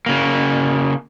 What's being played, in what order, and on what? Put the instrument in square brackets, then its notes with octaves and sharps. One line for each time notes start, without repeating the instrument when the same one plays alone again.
[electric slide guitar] C#3 A#3